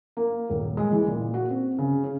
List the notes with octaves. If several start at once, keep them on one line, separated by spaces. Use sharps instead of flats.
A#3
D#1
G#3
E3
A#2
F#4
C4
C#3
C#4